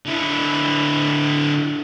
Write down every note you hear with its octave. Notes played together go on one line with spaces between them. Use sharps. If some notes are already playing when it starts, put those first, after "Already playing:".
D3 E4